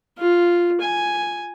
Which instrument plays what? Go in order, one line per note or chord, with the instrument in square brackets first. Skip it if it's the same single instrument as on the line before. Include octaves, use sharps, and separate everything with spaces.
[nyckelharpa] F4
G#5